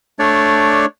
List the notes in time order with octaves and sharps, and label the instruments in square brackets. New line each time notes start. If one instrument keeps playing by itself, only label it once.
[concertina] A3 D4 C#5 D5